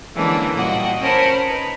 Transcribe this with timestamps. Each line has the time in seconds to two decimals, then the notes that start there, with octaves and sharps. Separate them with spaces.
0.15 D3 E3 G#3 A#3 C#4 D4
0.54 A#2 G3 F#4 D#5 G5
0.99 C#4 A#4 C5 A5 B5
1.44 D#4 B4